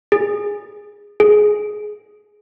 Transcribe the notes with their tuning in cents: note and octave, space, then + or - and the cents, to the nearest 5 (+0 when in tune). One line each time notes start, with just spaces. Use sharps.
G#4 -15
G#4 +15